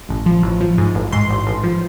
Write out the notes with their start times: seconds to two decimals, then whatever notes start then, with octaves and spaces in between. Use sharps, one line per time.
0.09 A1
0.26 F3
0.43 A1
0.61 F3
0.78 G#2
0.95 A1
1.12 G#2 C6
1.29 A1
1.46 A1
1.64 F3